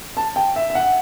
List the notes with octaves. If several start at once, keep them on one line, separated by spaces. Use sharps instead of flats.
A5
G5
E5
E5
F#5